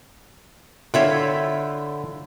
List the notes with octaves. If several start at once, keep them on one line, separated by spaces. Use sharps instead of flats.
D3 E4 F4 C#5 E5 G5